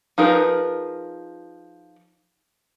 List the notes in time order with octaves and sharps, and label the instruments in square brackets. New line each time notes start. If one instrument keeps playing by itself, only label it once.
[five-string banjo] F3 D#4 G#4 A#4 B4